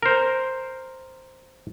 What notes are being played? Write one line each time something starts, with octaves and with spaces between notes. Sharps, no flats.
A#4 C5